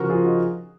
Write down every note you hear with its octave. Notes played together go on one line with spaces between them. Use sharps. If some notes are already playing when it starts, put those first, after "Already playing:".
Already playing: C#3 F3 F#4 A#4
F4 G#4
D#4 F#4